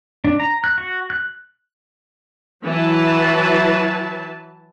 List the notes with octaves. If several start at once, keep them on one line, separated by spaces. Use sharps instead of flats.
D4
A#5
F#6
F#4
F#6
E3 F#3 E4 B4 A5